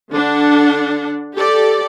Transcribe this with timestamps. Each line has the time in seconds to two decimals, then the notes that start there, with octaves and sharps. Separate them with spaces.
0.12 D3 D4 F#5
1.35 G4 A4 D5